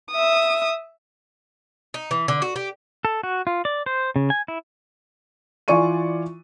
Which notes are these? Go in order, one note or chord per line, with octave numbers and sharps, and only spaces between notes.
E5 D#6
D#4
E3
D3
F#4
G4
A4
F#4
F4
D5
C5
C#3
G#5
E4
E3 F4 D5 G#5 C#6 D#7